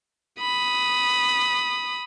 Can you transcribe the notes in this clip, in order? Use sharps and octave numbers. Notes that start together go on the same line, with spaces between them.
B5 D#6